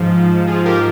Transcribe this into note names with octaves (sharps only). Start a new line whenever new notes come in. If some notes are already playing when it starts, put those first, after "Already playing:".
Already playing: G#2 F3
F4 G#4
G4 A#4